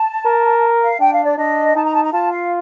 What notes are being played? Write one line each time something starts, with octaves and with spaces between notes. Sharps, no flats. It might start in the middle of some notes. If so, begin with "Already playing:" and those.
Already playing: A5
A#4
F5
D4 G5
F5
D5
D4 D#5
D#4 A5
A#5
A5
A#5
F4 A5
F5